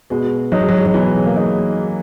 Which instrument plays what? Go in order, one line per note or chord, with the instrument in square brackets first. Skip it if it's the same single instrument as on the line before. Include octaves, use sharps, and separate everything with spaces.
[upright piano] B2 [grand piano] G#3
[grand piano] F#3 [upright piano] D#4
[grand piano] G#3
F#3
G#3
F#3
[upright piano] B2 [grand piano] E3
[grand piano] A#3
[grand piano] G#3 [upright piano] D#4